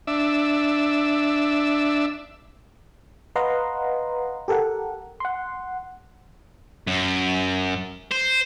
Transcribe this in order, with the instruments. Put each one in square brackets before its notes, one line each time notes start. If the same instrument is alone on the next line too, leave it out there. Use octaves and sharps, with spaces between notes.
[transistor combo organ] D4 E5
[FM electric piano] B4 D#5 F5 F#5 A#5 C6
G4 A4 A#4 F#5
F#5 C6
[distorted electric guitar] F#2
C5